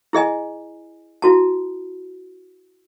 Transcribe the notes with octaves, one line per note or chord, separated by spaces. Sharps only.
E4 G#4 D#5 G#5
E4 F#4 A5